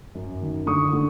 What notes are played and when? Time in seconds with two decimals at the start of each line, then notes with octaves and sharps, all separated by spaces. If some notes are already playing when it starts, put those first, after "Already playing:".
0.15 F#2
0.42 D#3
0.66 D3 C#6 D#6
0.93 D3